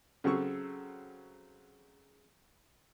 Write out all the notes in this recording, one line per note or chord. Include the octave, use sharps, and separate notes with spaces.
C#3 F#3 C4 A4 C#6